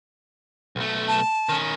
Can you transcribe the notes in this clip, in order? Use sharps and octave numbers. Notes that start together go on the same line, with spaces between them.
B1 A3
A5
D#3 C#4